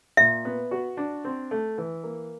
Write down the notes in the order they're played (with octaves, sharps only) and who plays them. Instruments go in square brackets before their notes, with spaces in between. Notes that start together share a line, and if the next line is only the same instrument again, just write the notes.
[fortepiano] A#2 [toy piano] E5
[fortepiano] B3
F#4
D4
C4
A3
E3
A#3